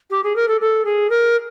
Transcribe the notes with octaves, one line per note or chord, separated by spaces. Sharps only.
G4
G#4
A#4
A4
A4
G#4
A#4